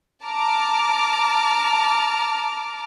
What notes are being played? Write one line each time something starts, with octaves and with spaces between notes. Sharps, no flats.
A5 A#5 D6 F6